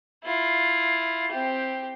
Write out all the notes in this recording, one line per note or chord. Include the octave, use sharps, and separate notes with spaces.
E4 F4
C4 G4